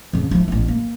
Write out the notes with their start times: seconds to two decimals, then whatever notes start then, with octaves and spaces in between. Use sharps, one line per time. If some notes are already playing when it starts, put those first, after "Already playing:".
0.13 F2 C#3
0.31 F3 E4
0.48 A1 B3
0.68 A#3